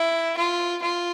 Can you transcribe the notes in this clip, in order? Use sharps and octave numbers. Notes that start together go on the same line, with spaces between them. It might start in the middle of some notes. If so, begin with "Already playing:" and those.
Already playing: E4
F4
F4